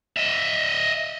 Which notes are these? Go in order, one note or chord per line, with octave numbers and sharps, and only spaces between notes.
D#5 E5